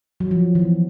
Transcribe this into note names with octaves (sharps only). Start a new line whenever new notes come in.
F#3
F3
E3